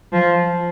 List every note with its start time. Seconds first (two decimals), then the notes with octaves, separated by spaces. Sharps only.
0.12 F3